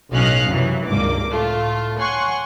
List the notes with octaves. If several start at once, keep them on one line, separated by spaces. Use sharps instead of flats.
B1 A2 C#4 D#5 F5 F#6
F#2 C3 E3 F#3
G#1 C#2 G2 A#3 D6
A2 A3 F4
C#5 F#5 G#5 C6 C#6